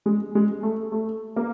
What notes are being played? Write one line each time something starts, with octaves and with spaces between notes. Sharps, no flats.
G#3
G#3
A3
A3
A#3